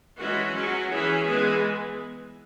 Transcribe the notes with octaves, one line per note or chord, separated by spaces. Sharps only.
E3 G#3 C#4 F#4
F#3 C#4
E3 C#4 G#4
E3 G#3 B3